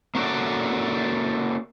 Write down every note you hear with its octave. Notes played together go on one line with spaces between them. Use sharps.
A#3 C#4 D4 F#4 A4 D5